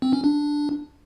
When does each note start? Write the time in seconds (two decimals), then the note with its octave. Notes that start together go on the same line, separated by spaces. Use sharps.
0.02 C4
0.13 C#4
0.24 D4